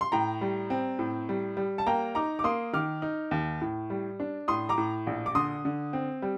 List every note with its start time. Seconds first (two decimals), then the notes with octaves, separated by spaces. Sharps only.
0.01 C6
0.12 A2 G5 A#5
0.41 G3
0.70 C4
0.99 A2
1.29 G3
1.57 G3
1.78 A5
1.86 A#3 G5 A#5
2.15 D#4 A#5 D6
2.39 D6
2.44 A#3 C6 D#6
2.73 D#3 D6 F6
3.02 D#4
3.31 D#2
3.61 A2
3.90 G3
4.20 D4
4.48 A2 C6 D#6
4.69 A#5 D6
4.78 A2
5.07 A#1
5.26 D6
5.35 D3 C6 D#6
5.65 D3
5.93 C4
6.22 G3